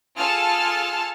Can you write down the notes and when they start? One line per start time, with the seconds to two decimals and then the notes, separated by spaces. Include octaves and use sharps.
0.18 F4 G#4 A4 A5 F6